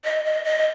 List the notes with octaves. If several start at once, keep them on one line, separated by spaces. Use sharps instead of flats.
D#5
D#5
D#5